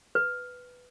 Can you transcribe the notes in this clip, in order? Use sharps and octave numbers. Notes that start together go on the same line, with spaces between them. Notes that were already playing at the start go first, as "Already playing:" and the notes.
B4